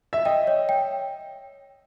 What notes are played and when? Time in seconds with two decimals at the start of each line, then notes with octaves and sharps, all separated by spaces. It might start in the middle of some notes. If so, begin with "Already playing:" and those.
0.13 E5
0.25 D#5 G5
0.47 C#5
0.69 G5